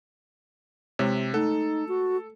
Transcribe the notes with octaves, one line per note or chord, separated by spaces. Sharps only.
C3 G#3 E4 C#5
A3 D#4 A4
F#4